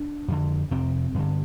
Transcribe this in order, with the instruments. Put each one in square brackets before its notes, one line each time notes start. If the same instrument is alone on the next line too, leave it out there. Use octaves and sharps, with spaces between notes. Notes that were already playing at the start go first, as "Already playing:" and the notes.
Already playing: [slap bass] D4
F2 D3
F2 C3 C4
G2 D3